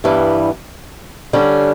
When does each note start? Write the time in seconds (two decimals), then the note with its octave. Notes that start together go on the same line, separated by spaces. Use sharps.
0.04 G2 E3 G3 B3
1.33 D3 G3 C#4